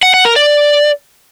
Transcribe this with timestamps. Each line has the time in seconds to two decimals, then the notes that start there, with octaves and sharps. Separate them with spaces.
0.03 F#5
0.14 F#5
0.25 A#4
0.36 D5